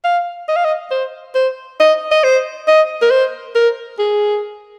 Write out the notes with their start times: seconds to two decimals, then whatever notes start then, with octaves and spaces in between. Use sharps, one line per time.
0.04 F5
0.48 D#5
0.56 F5
0.64 D#5
0.91 C5
1.35 C5
1.80 D#5
2.11 D#5
2.24 C5
2.68 D#5
3.02 A#4
3.11 C5
3.55 A#4
3.99 G#4